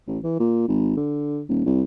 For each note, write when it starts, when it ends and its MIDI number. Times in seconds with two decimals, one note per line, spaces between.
0.07 0.19 33
0.24 0.37 52
0.39 0.65 46
0.68 0.96 32
0.97 1.42 50
1.49 1.63 27
1.66 1.82 36